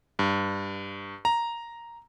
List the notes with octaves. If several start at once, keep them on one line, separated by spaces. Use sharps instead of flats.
G2
A#5